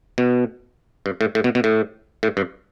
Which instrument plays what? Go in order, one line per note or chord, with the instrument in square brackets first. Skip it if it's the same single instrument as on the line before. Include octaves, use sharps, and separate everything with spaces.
[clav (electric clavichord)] B2
G2
A2
A2
B2
B2
A2
A2
G2